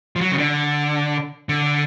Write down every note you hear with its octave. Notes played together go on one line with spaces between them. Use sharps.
F3
F#3
C#3
D3
D3